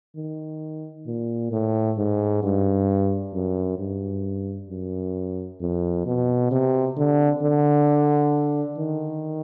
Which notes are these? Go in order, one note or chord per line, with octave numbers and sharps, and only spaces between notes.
D#3
A#2
A2
G#2
G2
F#2
G2
F#2
F2
B2
C3
D3
D3
D#3